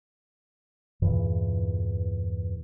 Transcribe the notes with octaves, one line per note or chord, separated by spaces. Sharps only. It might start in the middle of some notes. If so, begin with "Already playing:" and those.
E2 G2 A#2 E3